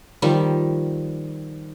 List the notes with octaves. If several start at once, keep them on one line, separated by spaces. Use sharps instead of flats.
D#3 F3 G3